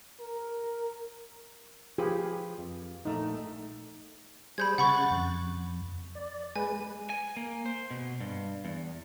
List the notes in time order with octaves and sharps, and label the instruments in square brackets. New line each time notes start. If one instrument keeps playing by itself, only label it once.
[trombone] A#4
[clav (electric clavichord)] F3 B4 [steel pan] F4 G4 G#4
[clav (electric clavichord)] F2
[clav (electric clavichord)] A#1 A3 [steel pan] D#4
[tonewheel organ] G3 G#4 C5 [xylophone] B5 G6 G#6
[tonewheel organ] C#3 F#6 A6 [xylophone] F#5 B5 C#6
[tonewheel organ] F2
D5
[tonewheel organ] G#3 B4 [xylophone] G#5
[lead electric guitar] G#5
A#3
C5
B2
G2
E2